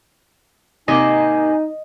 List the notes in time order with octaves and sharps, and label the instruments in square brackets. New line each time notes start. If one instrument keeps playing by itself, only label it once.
[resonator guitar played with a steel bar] C3 A#3 [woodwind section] D#4 [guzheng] D#5 [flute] G#5